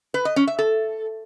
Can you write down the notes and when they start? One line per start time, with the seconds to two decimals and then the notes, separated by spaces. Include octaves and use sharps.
0.14 B4
0.25 D#5
0.36 C#4
0.47 E5
0.59 A4